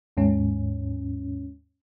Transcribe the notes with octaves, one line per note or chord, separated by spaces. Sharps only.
D#2 G#2 C#4